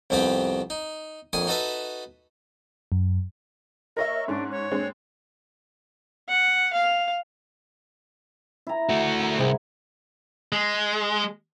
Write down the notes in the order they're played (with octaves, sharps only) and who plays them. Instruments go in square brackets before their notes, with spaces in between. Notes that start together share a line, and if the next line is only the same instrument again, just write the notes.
[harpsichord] C2 F2 B3 C4 G4 B5
D#4
A#1 F2 G#5 C#6 D#6
D#4 F#4 A4 B4 E5
[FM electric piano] F#2
[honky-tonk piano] A#4 C#5 E5 [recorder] D#5
[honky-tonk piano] G#2 C#4 [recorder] D4
[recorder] C#5
[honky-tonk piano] G#3 C4 D4
[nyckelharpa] F#5
F5
[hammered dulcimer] E4 A#5
[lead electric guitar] A3 F#4
[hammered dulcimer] A#4 F#5
[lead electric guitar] C2 [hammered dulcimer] G#2 E4 G#5
[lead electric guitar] G#3